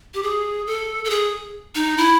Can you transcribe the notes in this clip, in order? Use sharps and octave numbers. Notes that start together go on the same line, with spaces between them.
G4
G#4
A4
A4
G#4
D#4
E4